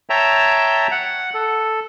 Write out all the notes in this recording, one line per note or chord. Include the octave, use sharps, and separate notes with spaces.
C#5 E5 G5 A5 A#5
F#5
A4